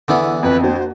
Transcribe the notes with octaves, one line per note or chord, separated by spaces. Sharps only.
E2 D3 E3 B3
F2 B4
A#3 D4 F#4 C5